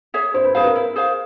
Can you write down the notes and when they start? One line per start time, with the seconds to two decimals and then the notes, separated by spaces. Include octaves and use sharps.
0.14 G#4 C#5 E5
0.34 E4 C5
0.44 B4
0.54 G#4 B4 C5 F5
0.64 A#4
0.75 E4
0.96 G#4 C5 F5